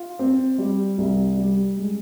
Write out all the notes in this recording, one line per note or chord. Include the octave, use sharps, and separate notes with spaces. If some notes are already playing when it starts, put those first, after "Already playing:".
Already playing: F4
C4
G3
C2
G3
G#3